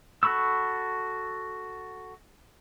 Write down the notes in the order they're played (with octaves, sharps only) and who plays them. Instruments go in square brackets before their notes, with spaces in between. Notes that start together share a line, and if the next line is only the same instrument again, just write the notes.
[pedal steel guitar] F#4 A4 B5 C#6 E6